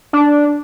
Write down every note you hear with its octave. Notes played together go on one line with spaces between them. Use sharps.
D4